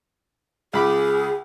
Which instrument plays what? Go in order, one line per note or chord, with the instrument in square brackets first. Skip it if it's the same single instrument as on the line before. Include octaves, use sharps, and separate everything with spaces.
[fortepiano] C#2 B5 D6 [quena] G#4